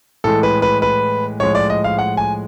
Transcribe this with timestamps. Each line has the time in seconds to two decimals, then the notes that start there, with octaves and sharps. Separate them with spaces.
0.24 A2 E3 G#3 A4
0.43 B4
0.62 B4
0.82 B4
1.40 A2 F3 G#3 C#5
1.55 D5
1.70 D#5
1.84 F5
1.99 F#5
2.17 G#5